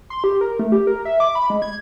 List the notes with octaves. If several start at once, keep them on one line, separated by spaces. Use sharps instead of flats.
C6
G4
A#4
A3
G4
A#4
E5
D6
B5
G#3
G#6